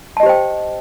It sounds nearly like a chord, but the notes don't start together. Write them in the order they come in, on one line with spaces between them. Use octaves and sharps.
A5 D#5 G4 C5 G5